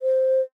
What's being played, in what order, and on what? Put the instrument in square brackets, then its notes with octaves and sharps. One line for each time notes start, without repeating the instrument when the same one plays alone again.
[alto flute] C5